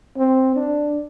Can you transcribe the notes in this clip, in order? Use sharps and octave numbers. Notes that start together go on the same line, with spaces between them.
C4
D4